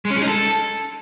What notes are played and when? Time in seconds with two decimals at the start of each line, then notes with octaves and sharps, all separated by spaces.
0.05 G#3
0.10 C#4
0.16 G#3
0.22 D#4
0.27 A4